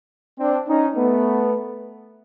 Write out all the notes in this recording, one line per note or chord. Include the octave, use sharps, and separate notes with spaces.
C4 D4
C#4 D#4
A3 B3